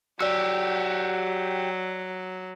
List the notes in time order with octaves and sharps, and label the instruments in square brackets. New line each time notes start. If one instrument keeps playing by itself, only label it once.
[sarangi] F#3 [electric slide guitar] F#4 G4 [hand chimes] D5 E6